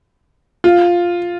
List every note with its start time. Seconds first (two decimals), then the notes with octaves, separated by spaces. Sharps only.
0.64 F4